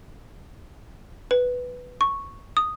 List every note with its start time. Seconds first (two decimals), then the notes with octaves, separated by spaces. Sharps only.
1.31 B4
2.01 C#6
2.57 D#6